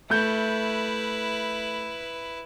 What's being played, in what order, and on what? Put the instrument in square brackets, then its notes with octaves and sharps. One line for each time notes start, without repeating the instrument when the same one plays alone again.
[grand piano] A3 G6 [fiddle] E4 B4